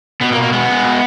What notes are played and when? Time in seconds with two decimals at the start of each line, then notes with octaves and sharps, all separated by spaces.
0.21 B2 B3
0.32 A#3
0.37 B2
0.42 A#3
0.53 G#3 B3
0.69 G#3
0.85 B2